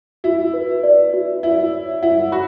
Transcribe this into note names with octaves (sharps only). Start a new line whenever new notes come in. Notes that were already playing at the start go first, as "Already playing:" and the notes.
E4 F#4
B4
D5
F#4
E4 F#4
C#5
E4 F#5
F#4 B5